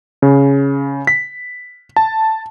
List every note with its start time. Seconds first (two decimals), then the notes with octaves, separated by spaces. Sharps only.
0.22 C#3
1.07 B6
1.96 A5